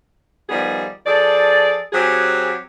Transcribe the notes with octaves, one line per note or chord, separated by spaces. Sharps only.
D#3 F3 G3 B3 G#4
F3 G#4 A4 D5
F#3 C4 G4 G#4